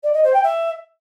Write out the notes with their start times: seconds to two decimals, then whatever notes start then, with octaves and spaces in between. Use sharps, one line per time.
0.03 D5
0.13 D#5
0.23 C5
0.33 G5
0.43 E5